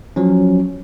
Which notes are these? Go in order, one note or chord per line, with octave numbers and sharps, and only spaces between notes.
F3 F#3 C#4